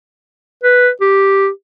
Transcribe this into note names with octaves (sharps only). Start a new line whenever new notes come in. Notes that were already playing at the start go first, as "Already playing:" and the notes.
B4
G4